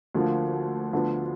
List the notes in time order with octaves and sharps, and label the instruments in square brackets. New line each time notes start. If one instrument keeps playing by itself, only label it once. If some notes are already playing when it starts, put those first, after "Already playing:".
[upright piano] D2 D3 F3 A#3 F4
D2 D3 F3 B3 D4